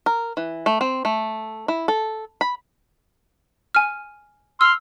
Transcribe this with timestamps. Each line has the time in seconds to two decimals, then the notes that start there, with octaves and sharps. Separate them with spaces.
0.06 A#4
0.37 E3
0.66 A3
0.81 C4
1.05 A3
1.68 E4
1.88 A4
2.41 B5
3.75 G#5 F6
4.61 C6 E6 F6